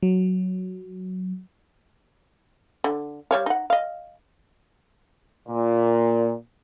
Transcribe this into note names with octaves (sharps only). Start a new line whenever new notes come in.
F#3
D3
G3 C#5 F5
D#4 F#5
D#5 F5
A#2